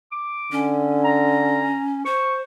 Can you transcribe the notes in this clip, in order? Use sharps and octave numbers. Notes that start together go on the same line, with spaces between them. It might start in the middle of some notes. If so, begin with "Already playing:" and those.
D6
D3 C#4
A#5
C5 C#6